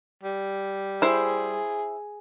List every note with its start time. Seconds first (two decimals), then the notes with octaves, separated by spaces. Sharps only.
0.23 G3
1.02 E4 G#4 C5